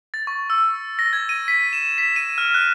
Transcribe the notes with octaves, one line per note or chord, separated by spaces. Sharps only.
A6
C#6
E6
A#6
G#6
D#7
B6
E7
B6
D#7
F6
F#6